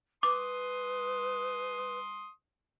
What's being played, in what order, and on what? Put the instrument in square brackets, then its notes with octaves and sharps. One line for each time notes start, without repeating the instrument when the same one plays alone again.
[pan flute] B4 [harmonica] C6 D#6 [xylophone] D6